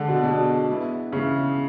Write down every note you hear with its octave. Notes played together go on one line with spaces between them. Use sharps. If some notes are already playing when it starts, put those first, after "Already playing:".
Already playing: D3 G#3 D4 A4 D5
B2
B2 G#3 D4 A4 D5
G#3 B3 E4
C#3 G#3 B3 E4